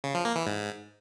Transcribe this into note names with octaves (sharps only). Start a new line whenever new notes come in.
C#3
F3
A#3
E3
G#2